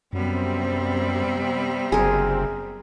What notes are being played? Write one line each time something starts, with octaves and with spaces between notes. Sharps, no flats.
F#2 C3 G3 B3 C4
F#1 G#4 A#4